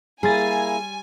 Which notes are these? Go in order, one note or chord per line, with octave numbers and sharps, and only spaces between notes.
G3 A#3 E4 G#4 G#5 A#5 C6 A6